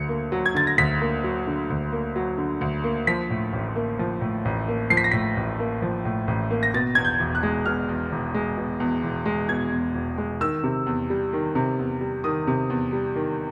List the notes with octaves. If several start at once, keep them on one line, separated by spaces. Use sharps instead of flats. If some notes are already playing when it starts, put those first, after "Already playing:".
Already playing: D2 D3 F#3 C#7
A#3
F#3
G#6
D3 A6
A#6
D2 B6
A#3
F#3
D3
D2
A#3
F#3
D3
D2
A#3
F3 B6
A2
A1
A#3
F3
A2
A1
A#3
F3 C7
B6
A#6
A2 B6
A1
A#3
F3
A2
A1
A#3
A#6
B2 A6
E2 G#6
G6
E1
F#6
G#3
B2 F6
E2
E1
G#3
B2
E2
E1
G#3
B2 G#6
E2
E1
G#3
D#3 E6
C3
E2
G3
D#3
C3
E2
G3
D#3 D#6
C3
E2
G3
D#3